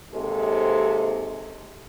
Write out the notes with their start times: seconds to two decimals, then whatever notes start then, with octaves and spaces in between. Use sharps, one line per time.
0.13 D#2 C3 G#3 C4 A4